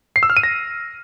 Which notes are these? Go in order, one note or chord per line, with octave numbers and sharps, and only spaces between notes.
C7
E6
F6
D#7
A#6